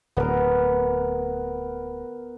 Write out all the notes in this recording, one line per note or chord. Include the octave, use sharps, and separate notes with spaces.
D1 B3 A#4